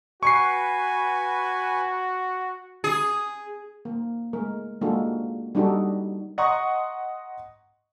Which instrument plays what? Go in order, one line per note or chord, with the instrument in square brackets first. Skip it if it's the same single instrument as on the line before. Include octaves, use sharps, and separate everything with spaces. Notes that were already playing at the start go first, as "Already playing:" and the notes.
[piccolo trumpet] F#4 [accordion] B4 G#5 [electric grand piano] C#6 C7
[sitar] G#4
[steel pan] A#3
G#3 A3 A#4
G#3 A#3 D4 F4 F#4 A4
G3 D4 D#4 F#4 G4 A4
[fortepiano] D#5 F#5 A#5 C6 C#6 D#6